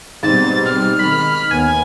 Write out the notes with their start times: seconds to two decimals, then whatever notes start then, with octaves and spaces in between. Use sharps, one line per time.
0.23 G#2 B2 G3 C4 A6
0.65 F6
0.99 D#3 B5
1.51 D#2 B3 G#5